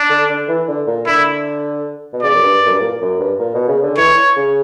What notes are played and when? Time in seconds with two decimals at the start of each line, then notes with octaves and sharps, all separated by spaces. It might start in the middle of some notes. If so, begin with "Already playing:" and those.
Already playing: D4
0.10 D3
0.29 D3
0.49 E3
0.68 D3
0.87 A#2
1.07 D3 E4
2.13 B2
2.23 C#3 D5
2.34 F#2
2.43 G2
2.66 F#2
2.73 G2
2.81 A#2
3.01 F#2
3.19 G2
3.39 A#2
3.54 B2
3.68 C#3
3.82 D3
3.97 E3 C#5
4.36 C#3